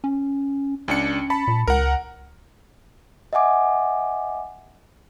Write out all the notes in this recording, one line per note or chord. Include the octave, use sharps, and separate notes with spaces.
C#4
C#2 C#4 D4 C#7
A5 B5
A#2
C#2 A#4 F#5
D#5 E5 F#5 G#5 D6